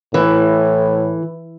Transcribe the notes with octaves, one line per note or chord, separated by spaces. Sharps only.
A2 E3